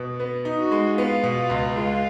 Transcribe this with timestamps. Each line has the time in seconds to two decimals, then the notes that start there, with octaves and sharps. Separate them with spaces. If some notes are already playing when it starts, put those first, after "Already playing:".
Already playing: B2
0.20 B3
0.45 D#4
0.59 F#4
0.72 G#3
0.98 B3 F4
1.23 B2
1.36 F4
1.50 C#2
1.76 G#3 F4